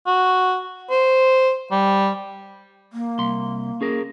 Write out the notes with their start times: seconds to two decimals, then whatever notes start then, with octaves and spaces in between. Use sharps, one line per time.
0.07 F#4
0.90 C5
1.71 G3
2.93 A#3
3.19 C2 C6
3.81 C#4 G#4 A#4